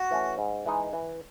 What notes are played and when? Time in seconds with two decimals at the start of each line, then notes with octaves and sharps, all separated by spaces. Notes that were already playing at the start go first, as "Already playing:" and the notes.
Already playing: F#4
0.11 E3 A3 C#4
0.38 G#2
0.66 E3 G#3 D#4
0.93 E3